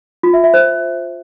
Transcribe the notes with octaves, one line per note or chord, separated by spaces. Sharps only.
F4
E5
E5
C5